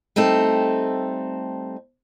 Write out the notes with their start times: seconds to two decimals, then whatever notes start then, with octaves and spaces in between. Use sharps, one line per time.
0.16 G3 A3 C4 D#4 A4